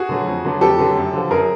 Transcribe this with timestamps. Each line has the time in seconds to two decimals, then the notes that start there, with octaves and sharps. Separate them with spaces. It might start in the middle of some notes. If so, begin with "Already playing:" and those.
Already playing: F#4 G#4
0.09 D3 F#3 A3
0.27 F2
0.45 D3 F#3 A3
0.61 F2 G4 A4
0.79 D3 F#3 A3
0.96 F#2
1.13 D3 F3
1.30 F#2 G#4 A#4